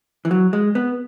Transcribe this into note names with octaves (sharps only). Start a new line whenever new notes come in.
E3
F#3
G#3
B3